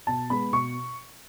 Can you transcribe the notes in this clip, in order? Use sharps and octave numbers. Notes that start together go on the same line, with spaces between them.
B2 A5
G#3 B3 B5
B2 C#6